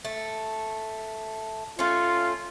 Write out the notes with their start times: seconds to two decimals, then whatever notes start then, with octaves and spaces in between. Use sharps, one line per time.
0.05 A3
1.79 A3 C#4 F4